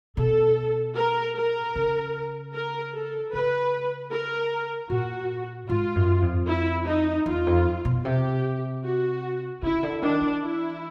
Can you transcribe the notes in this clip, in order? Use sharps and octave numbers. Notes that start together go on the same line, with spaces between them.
B2 A4
A#4
A#4
C#3
A#4
A4
C#3 B4
A#4
A#2 F#4
G#2 F4
F#2
F2
E4
D#4
E2 F4
F2
B2
C3 G4
F#4
C#3 E4
D3
D#3 D4
E3
E4